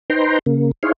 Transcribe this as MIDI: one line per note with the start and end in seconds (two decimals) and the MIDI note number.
0.10 0.39 63
0.10 0.39 71
0.10 0.39 72
0.10 0.39 79
0.10 0.39 82
0.10 0.39 84
0.46 0.71 49
0.46 0.71 58
0.83 0.92 63
0.83 0.92 64
0.83 0.92 68
0.83 0.92 72
0.83 0.92 73
0.83 0.92 77